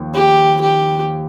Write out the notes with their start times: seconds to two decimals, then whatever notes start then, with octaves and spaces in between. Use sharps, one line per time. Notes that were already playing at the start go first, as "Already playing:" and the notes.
Already playing: D#2 F3
0.14 G4
0.61 G4